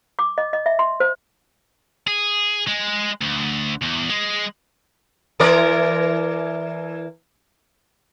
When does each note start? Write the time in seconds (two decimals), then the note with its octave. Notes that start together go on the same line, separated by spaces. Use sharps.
0.19 D6
0.38 D#5
0.53 D#5
0.66 E5
0.79 C6
1.00 C5
2.07 G#4
2.68 G#3
3.21 D2
3.82 E2
4.10 G#3
5.40 E3 A#4 D5